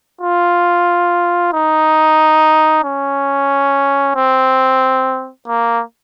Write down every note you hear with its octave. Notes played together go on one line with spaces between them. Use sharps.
F4
D#4
C#4
C4
A#3